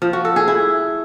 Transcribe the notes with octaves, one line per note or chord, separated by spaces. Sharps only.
F3
F#4
A4
G#4
E4